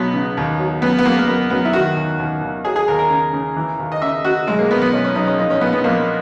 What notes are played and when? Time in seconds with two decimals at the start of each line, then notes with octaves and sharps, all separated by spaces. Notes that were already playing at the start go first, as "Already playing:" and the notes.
Already playing: B1 F#3 B3
0.13 C#3
0.37 D#2
0.59 F#3
0.82 F#2 B3
0.98 B3
1.05 F#2 A#3
1.17 A#3
1.27 F#2 B3
1.50 F#2 B3
1.65 E4
1.73 D#3 F#4
1.96 D#2
2.19 D#2
2.42 D#2
2.65 F#3 G#4
2.76 G#4
2.88 D#2 A#4
2.99 A#4
3.10 C#3
3.33 C#3
3.56 E3
3.79 D#2
3.92 D#5
4.02 C#3 E5
4.24 C#3 F#4
4.48 B1 G#3
4.59 A#3
4.71 B1 B3
4.82 B3
4.93 B1 C#4
5.04 C#4
5.15 B1 D#4
5.27 C#4
5.38 A#1 D#4
5.50 C#4
5.61 A#1 B3
5.73 B3
5.84 A#1 A#3